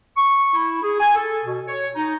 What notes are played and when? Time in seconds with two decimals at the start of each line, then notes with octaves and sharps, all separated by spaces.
0.17 C#6
0.54 E4
0.83 G#4
1.00 G#5
1.16 A4
1.46 B2
1.68 C#5
1.96 D#4